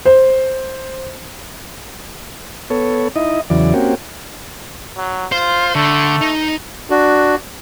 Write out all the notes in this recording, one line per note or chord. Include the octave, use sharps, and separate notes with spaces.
C5
B3 A4 C#5
D#4 E4 D#5
E2 C#3 E3 F#3 D5
A#3 C4 C#4 F#4 G4
F#3
F4 C5
D3 A3
D#4
D4 F#4